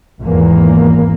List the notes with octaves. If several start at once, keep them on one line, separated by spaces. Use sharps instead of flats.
G#1 E2 A#3